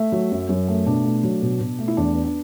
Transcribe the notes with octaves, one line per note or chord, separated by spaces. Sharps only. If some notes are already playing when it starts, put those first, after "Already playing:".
Already playing: A3 E5
F#3
F#2
F#2
A3
B2 D4
A3
F#3
B2
B2
A3
E4
E2 D4
B3
D4